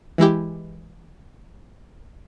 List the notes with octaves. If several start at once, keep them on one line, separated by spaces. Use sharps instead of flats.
E3 G#3 E4 G4